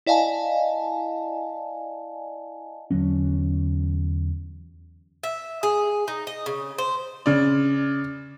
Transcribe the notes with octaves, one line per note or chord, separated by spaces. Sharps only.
E4 D5 D#5 F5 G#5 A5
E2 D3 F#3 C#4
E5
G#4
D#4
D#5
C#3
C5
C#3 D5